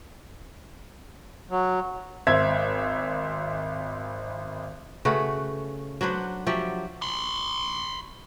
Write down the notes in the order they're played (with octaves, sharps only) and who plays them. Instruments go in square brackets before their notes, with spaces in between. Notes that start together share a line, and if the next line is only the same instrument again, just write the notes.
[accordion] F#3
[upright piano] G#1 C5 E5 G#6
[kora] C#3 A3 F#4 B4
F#3 D4 B4 C5
F3 F#3 G4 E5
[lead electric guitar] B5 C6